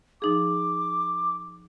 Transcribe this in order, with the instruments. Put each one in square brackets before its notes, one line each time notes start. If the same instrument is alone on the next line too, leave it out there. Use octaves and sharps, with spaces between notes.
[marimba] F3 D#4 G#4 [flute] D6